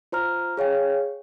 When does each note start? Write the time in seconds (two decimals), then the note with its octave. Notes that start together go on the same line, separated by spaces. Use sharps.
0.12 F4 C5 A#5 F6
0.57 G#4 C#5 F5 G5